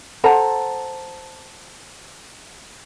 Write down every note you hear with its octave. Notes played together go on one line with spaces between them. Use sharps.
A4 C5 F#5 A#5